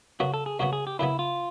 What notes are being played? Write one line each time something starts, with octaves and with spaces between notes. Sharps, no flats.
F#2 C#3 F#3 B3 F#4
A4
G#4
F#2 C#3 F#3 B3 F#4
G#4
G4
F#2 C#3 F#3 B3 E4
F4